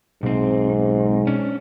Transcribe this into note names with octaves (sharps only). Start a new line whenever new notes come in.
B1 G#2 C4
C#4 D4